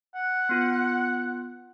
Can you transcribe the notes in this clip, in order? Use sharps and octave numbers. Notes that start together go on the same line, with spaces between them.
F#5
B3 F4